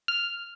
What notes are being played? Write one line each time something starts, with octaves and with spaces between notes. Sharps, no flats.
F6